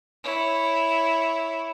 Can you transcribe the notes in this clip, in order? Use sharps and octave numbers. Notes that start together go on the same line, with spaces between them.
E4 C#5